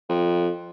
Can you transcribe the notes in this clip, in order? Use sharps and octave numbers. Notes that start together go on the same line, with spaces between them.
F2